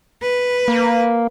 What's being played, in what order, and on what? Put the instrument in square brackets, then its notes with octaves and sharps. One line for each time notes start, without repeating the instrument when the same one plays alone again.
[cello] B4
[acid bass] A#3